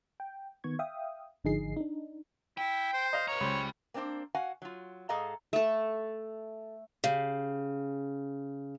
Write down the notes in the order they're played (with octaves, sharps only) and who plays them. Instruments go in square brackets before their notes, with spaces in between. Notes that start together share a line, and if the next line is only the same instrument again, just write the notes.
[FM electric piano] G5
D#3 B3 C#6 G#6
E5 F5 G5 D#6
G#1 D3 F3 D#4 G#4 C7
D4 D#4
[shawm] E4 [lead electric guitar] G5
[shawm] C5
[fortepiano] D#5 F5
[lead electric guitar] B4 A#5 [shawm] C#5
[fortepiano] C#2 C5 [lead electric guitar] G4 B5
[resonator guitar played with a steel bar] A#3 C4 D4 F4 C5
F#4 F5 F#5 G#5
F#3 F4
G#2 G#4 A4 D#5 F5 A#5
[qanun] A3 A4
[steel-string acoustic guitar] C#3 [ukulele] G4 F5